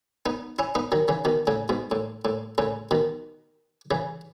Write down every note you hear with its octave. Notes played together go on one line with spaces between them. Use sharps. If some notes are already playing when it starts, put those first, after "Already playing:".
B3 D#4
C#4 E4
B3 D#4
D#3 F#3
C#3 E3
B2 D#3
A2 C#3
G#2 B2
A2
A2
A2 C#3
B2 D#3
C#3 E3